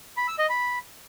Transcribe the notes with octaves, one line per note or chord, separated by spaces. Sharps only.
B5
E6
D#5
B5